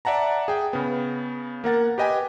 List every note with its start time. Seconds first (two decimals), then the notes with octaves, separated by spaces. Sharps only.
0.05 D5 E5 F#5 A5 A#5
0.48 G#4 G5
0.73 C#3 B3
1.64 A#3 A#4 F#5 A6
1.98 G4 B4 D#5 G5 G#5